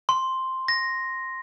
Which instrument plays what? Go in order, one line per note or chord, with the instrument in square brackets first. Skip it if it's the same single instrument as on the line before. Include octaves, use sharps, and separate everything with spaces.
[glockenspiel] C6
A#6